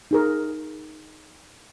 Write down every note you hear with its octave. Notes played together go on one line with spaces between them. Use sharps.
D#4 G#4 A#4